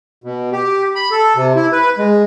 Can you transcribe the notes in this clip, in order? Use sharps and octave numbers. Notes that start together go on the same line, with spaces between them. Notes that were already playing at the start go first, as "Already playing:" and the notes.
B2
G4
B5
A4
C3
E4
B4
G#3